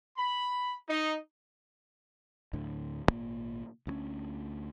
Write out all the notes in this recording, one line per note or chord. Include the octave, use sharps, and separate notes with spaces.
B5
D#4
D2 A2 D3
G#1 G2 A#2 A#3
D2 G#3 C#4